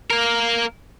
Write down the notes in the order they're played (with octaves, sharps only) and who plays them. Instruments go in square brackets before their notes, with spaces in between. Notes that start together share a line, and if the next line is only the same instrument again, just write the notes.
[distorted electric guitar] A#3 A#4